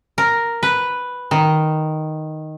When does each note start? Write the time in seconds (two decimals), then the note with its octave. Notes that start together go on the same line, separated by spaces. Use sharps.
0.18 A#4
0.63 B4
1.31 D#3